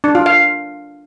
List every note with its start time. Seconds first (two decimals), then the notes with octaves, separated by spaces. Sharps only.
0.04 D4
0.15 F4
0.26 F5